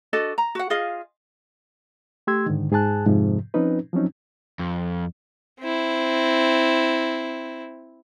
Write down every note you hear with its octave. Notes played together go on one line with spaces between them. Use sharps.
D4 F#4 A4 D#5
A#5
F#4 F#5
F4 G#4 D#5 F5
A3 G4 C6 E6 G#6
G#2 D3 D#3
G#2 G#4 G#5 A5 F#6
F2 G#2 C3 F3
F3 C4 C#4 D#4 B4
F3 F#3 C4 C#4 D#4
F2
C4 E4